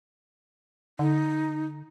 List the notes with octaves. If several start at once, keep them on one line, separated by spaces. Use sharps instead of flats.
D3 D#4